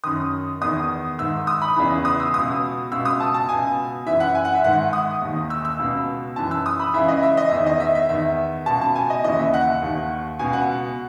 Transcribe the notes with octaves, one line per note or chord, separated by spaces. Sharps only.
F#2 D#3 D#6
E2 D#3 D#6
G#2 D#3 E6
D#6
B5
E2 C#3 E3
D#6
E6
C#2 B2 D#6
C#2 B2 E6
D#6
A5
A5
C#2 B2 G#5
F#2 E3 E5
F#5
G#5
F#5
E5
G#2 D#3 F#5
D#6
D#2 D#3
E6
E6
C#2 B2
F#2 E3 A5
E6
D#6
B5
C#2 C#3 E3 E5
D#5
E5
D#5
E2 D#3 E5
D#5
E5
E5
E2 D#3 E5
C#2 B2 A5
A5
G#5
D#5
D#2 C#3 E3 D#5
E5
F#5
D#2 D#3
C#2 B2 G#5
F#5